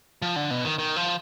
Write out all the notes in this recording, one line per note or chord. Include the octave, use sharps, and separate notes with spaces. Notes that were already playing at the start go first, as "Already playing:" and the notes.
F3
D3
B2
D#3
D#3
F3